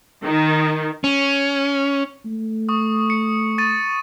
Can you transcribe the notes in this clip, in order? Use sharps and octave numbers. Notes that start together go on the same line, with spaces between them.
D#3
C#4
A3
C#6 D#6
C#7
C#6 A6 D#7